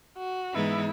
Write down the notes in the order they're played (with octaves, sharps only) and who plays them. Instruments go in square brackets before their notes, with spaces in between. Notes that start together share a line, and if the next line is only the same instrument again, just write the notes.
[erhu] F#4
[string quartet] G#2 E3 G#3 B3 D#4 [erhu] E4